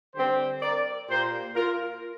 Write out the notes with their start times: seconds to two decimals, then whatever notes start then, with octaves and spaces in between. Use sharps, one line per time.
0.15 D3 G3 C4 G4 C5
0.62 A#4 D5
1.08 A#2 A#3 G4 C5
1.55 F4 A#4